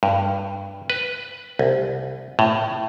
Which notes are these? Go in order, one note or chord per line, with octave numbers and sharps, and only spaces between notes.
G2
B4
C2
A2